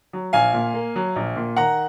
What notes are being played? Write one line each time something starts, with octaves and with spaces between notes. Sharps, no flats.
F#3
A#1 F5 G#5
A#2
A#3
F#3
A#1
A#2
D#3 F#5 A#5